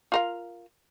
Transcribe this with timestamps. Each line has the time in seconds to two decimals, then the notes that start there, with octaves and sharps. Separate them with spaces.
0.12 F4 A#4 F5